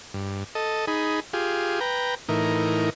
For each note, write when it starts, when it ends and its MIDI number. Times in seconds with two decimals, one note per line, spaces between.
0.14 0.44 43
0.55 0.85 69
0.55 0.85 75
0.87 1.20 63
0.87 1.20 68
0.87 1.20 83
1.33 1.80 65
1.33 1.80 67
1.33 1.80 68
1.80 2.15 71
1.80 2.15 79
1.80 2.15 82
2.29 2.90 45
2.29 2.90 52
2.29 2.90 63
2.29 2.90 70